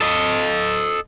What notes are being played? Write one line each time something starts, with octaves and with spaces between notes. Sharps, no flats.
A4 D#5